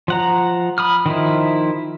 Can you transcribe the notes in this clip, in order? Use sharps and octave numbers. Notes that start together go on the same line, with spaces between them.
F3 F#5 A#5
B5 D#6 F6
D#3 F3 E4